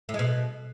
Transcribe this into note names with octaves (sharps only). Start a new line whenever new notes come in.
A2
G#3
B2